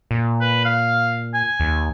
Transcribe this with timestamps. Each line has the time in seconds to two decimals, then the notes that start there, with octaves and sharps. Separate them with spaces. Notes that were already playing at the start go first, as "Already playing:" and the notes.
0.11 A#2
0.41 B4
0.65 F5
1.34 G#5
1.60 D#2